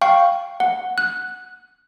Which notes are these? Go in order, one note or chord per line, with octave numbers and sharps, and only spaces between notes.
F5 G5 C#6
F#5
F#6